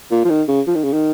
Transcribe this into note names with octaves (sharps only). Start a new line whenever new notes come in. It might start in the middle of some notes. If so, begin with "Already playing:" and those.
A#2
F3
D#3
C#3
F3
D#3
C#3
D#3